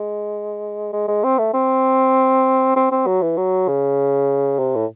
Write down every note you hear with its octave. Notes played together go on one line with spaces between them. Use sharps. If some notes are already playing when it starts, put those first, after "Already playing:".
Already playing: G#3
G#3
G#3
C4
A3
C4
C4
C4
F#3
E3
F#3
C#3
C3
A2